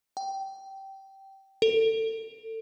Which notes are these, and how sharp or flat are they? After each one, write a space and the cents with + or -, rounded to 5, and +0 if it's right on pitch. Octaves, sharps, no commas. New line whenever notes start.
G5 -15
A4 +25